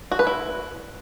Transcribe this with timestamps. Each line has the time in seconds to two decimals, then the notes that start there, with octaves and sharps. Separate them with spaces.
0.11 F#4
0.19 B4
0.27 E4